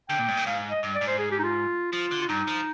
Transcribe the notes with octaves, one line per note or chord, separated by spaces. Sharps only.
D3 G5
A#2
G#2
A#2
G#2 F5
D#5
G2
D5
G#2
C5
G#4
G4
D#4
F4
F3 F4
D3
F4
G2 D#4
F3